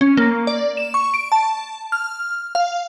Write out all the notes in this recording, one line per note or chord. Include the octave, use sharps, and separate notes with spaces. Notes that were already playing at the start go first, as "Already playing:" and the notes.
C#4
A#3
D5
E7
C#6
D7
A5
F6
F5